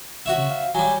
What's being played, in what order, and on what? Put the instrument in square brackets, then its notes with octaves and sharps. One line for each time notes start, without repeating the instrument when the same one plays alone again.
[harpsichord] F#4 C#5 E5
[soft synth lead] C#3
F5
[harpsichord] F#3 G3 [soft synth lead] G#5